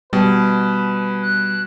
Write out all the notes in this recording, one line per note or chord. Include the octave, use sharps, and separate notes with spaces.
B2 G3 B4
F#6